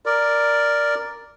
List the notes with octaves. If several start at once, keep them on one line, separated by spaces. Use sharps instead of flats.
A#4 D5